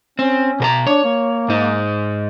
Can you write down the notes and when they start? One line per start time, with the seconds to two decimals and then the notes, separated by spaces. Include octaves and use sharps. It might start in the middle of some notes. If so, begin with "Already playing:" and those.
0.19 C4 C#4
0.60 B2 A#4 A#5
0.87 D4 C#5
1.04 A#3
1.48 G#2 D#4